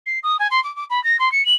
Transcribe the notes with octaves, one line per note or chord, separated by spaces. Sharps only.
C7
D#6
G#5
C6
D6
D6
B5
A#6
C6
C#7
F#7